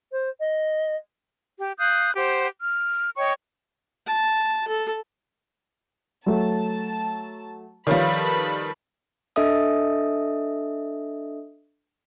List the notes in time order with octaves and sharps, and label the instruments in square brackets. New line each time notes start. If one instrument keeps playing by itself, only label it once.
[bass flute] C5
D#5
[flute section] G4
F5 D#6 F#6 G6
G4 C5 F#5
F6
C#5 D#5 G5 C#6
[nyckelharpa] A5
A4
[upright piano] F#3 A3 [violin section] A5
[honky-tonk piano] D#3 F3 G3 [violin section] A4 B4 B5 [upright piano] C#5 F5
[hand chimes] D4 A4 D#5 E5 D#6